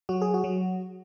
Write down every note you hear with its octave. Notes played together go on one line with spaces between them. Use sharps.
F#3 F#4
G#4
F#4
F#3